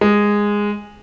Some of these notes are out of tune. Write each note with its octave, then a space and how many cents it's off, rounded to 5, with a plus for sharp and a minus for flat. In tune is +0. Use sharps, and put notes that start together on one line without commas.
G#3 -10